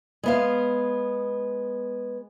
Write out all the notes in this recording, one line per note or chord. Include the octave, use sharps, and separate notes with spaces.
G#3 B3 F5